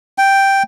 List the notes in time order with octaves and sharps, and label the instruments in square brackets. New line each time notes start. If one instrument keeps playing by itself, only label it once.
[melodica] G5